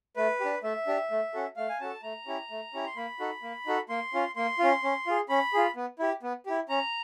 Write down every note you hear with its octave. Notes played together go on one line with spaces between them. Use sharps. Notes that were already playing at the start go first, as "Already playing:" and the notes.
A3 B4
D4 G4
A3 E5
D4 G4
A3
C#4 F#4 A4
A3 F5
G#5
C#4 F#4 A4 A5
A3 A#5
C#4 E4 G4
A3
C#4 E4 G4
C6
A#3 B5
D#4 F#4 A4
A#3
D#4 F#4 A4
A#3 C6
C#4 F4
A#3 C6
C#4 F4
C#4
F4 G#4
C#4 B5
F4 G#4
B3
E4 G4
B3
E4 G4
C#4 A#5